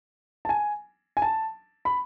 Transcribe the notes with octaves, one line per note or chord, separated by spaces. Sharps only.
A5
G#5
G#5
A5
B5